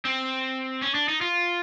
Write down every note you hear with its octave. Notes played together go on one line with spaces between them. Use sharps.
C4
C#4
D4
D#4
F4